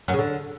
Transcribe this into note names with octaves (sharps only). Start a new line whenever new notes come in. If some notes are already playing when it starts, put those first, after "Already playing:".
F#2
C#3
D3